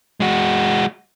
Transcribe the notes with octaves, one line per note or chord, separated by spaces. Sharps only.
G#3 F#4